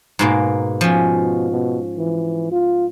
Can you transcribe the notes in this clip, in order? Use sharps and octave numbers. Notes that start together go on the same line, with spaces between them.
G#2 B2 A#3
B2 F3 C#4
B2
E3
F4